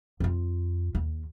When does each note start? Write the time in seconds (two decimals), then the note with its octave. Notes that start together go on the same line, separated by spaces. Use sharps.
0.20 F2 F4
0.95 D#2